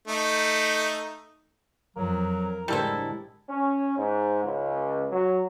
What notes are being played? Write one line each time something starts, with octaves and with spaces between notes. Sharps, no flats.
A3 D#4
F2 F#3 A#4
A2 D3 G3 G#3 E4 A4 C5
C#4
G#2
C#2
F#3